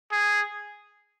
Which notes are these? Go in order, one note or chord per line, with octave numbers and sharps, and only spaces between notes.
G#4